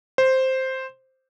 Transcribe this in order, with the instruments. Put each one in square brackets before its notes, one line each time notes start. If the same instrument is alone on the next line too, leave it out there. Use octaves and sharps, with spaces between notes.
[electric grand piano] C5